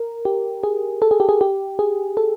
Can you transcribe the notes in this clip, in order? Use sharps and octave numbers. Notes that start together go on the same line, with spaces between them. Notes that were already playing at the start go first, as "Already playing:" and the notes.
Already playing: A#4
G4
G#4
A4
G#4
G4
G#4
G4
G#4
A4